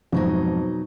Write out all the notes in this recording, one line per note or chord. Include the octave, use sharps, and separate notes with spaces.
F2 G#2 B2 F#3 D#4